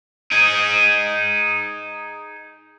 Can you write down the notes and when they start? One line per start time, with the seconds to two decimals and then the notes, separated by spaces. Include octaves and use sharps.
0.31 D#4 G#4